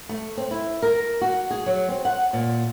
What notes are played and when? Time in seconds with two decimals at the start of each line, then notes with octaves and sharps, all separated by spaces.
0.09 A3
0.37 C4
0.51 E4
0.82 A#4
1.21 F#4
1.51 G#4
1.66 F#3
1.89 C4
2.05 F#5
2.33 A#2